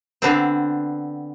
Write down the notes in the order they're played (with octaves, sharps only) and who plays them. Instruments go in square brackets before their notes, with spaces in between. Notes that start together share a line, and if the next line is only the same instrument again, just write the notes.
[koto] D3 B3 C4